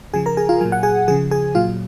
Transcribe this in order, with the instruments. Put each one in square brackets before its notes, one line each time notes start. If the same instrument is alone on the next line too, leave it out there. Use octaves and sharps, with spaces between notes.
[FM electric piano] C#3 F3 G#4 G#5
A#4 A#5
G#4 G#5
F4 F5
A#2 F#3 G#5
F#5
G#4 G#5
C#3 F3 G#4 G#5
G#4 G#5
A#2 F#3 F4 F5